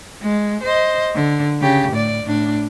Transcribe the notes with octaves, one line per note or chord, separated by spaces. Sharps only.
G#3
C5 D#5
D3
C#3 G4
A2 D5
A2 D4